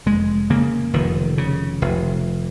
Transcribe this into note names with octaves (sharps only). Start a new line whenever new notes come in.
F1 G#3
C#3 A#3
F1 D#3
C#3
F1